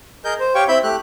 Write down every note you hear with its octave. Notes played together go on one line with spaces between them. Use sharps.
G#4 A#4 D#5 G6
C5
G4 C#5 F5 G5 C#6
C4 E4 E5 B5 G6
A3 G4 F#6